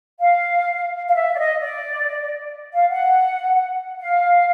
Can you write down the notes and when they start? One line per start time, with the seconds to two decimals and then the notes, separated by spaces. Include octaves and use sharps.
0.20 F5
1.08 F5
1.15 E5
1.35 D5
1.39 D#5
1.62 D5
2.74 F5
2.90 F#5
4.01 F5